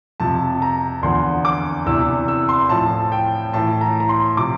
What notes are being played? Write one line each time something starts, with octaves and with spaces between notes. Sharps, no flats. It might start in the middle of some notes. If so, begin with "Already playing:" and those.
F2 C3 F3 A5
A#5
E2 D3 F3 C6
D6
E2 C3 E3 E6
E6
C6
A2 F3 A5
G5
A2 E3 A5
A#5
A#5
C6
C3 F3 D6